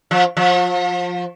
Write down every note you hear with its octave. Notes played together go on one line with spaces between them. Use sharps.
F3
F3